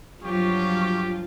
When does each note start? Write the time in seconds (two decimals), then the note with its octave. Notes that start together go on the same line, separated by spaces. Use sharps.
0.22 G2 F3 F#3 F4 G4 C#6